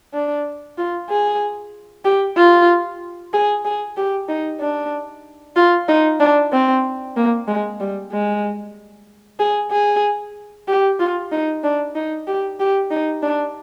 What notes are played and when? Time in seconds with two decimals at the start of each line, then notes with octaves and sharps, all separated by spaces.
0.14 D4
0.78 F4
1.09 G#4
2.05 G4
2.37 F4
3.33 G#4
3.65 G#4
3.97 G4
4.29 D#4
4.61 D4
5.56 F4
5.88 D#4
6.20 D4
6.52 C4
7.17 A#3
7.48 G#3
7.80 G3
8.12 G#3
9.39 G#4
9.71 G#4
10.68 G4
10.99 F4
11.32 D#4
11.64 D4
11.95 D#4
12.27 G4
12.60 G4
12.91 D#4
13.23 D4